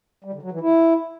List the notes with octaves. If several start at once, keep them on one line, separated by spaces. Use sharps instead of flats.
G3
D3
F#3
E3
E4